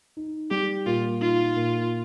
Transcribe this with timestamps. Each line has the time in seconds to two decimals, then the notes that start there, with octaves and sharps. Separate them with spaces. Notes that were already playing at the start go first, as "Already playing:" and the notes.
0.17 D#4
0.51 G3 G4
0.86 A#2 F4
1.21 D#4 F4
1.56 A#2